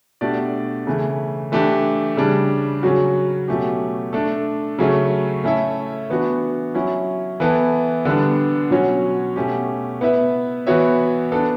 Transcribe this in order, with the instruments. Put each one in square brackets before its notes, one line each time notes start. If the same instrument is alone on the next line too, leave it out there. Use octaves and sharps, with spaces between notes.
[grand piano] B2 A3 D4 G4 D5
C#3 E3 A3
E3 A3 D4 G4
C#3 G3 D4
C#3 F#3 C#4 F#4
B2 F#3 A3 C#4 G4
A3 D4 A4
C#3 F#3 A3 C#4
A3 C#4 E4 A4 E5
E3 B3 D4 F#4
F#3 C#4 E4
E3 B3 E4 A4
D3 G3 B3 D4
B2 F#3 C#4 F#4 C#5
B2 A3 C#4 G4
B3 E4 B4 E5
E3 B3 F#4 C#5 E5
B3 D4 A4